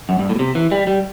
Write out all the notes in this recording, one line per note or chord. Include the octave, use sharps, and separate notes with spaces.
F#2
G2
A2
B2
C3
E3
G3
G3